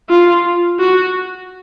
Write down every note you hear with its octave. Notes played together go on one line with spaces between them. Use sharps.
F4
F#4